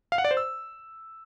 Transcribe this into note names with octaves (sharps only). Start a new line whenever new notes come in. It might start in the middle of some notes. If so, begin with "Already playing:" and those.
F5
F#5
D5
C5
E6